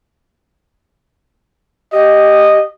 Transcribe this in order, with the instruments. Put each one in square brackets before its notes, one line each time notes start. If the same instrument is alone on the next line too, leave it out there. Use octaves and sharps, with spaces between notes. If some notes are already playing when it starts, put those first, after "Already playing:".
[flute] G4 [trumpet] D#5